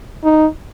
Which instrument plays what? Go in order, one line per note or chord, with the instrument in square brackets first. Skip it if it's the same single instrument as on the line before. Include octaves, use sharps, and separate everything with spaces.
[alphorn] D#4